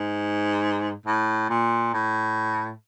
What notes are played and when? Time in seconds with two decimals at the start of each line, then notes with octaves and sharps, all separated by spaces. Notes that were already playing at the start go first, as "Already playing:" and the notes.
Already playing: G#2
1.06 A2
1.50 A#2
1.94 A2